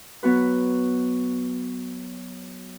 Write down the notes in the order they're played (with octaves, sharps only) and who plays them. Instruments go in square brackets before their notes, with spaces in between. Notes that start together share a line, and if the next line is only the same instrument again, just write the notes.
[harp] F#3 B3 F#4 B4